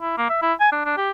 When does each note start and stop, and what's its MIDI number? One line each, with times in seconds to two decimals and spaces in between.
0.01 0.17 64
0.18 0.27 58
0.30 0.41 76
0.42 0.53 64
0.60 0.69 80
0.72 0.84 62
0.85 0.95 62
0.97 1.11 67